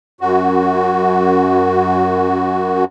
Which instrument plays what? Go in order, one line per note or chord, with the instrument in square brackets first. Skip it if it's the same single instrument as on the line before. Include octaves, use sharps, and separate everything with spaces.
[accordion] F#2 F#4